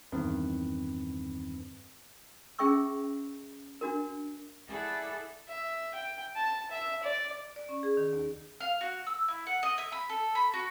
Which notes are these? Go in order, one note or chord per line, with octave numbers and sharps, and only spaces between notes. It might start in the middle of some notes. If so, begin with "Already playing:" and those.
E2 G2 D#3 C4 B4
C#4 G#4 E5 G5 C#6 E6
D4 F#4 A#4
E4 G#4 A4 D5 E5 F#5
E5
G5
A5
E5
D5
D5
C#4
G#4
D#3
D#2
F5
F#4
E6
E4
F#5
D#5
E5
B5
A4
B5
F#4